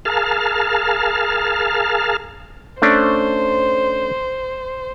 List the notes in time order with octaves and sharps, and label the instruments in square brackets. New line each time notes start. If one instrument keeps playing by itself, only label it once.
[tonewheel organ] G#4 A#4 F5 A5 F6
[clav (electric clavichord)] A3 C#4 D4 [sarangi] C5